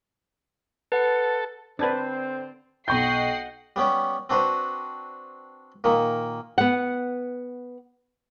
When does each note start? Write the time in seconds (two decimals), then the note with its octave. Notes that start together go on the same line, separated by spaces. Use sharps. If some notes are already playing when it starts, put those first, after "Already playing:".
0.92 A4 B4 F#5
1.79 D3 C4 D4 B4 C5 A5 G#6 A6
2.88 B1 D#5 F#5 G5 C#6 G6 C7
3.76 G3 B3 C#4 G4
4.29 C4 D4 F#4 B4 C5
5.84 A#2 D#3 A#3
6.58 B3 F#5